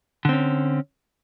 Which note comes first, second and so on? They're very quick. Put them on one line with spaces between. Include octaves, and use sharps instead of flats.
D3 C4 C#4